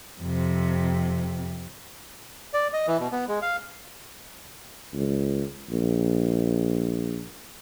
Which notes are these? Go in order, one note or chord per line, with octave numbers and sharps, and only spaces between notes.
F2 C3
D5
D#5
E3
B2
B3
G#3
F5
C#2
A#1